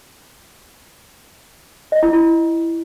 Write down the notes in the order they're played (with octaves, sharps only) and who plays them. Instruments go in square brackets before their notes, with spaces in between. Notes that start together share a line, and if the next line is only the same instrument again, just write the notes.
[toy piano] D#5
E4
E4